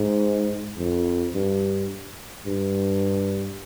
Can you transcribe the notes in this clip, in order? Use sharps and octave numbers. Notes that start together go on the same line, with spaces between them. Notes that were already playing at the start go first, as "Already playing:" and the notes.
Already playing: G#2
F2
G2
G2